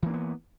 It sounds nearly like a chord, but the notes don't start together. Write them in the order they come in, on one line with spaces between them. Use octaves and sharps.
E3 A#3 D4 B3